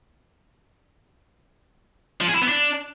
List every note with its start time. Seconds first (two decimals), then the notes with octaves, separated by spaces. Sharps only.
2.21 F3
2.28 G#4
2.34 E4
2.41 B3
2.48 D4